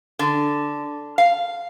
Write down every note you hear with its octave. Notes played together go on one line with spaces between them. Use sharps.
D3
F5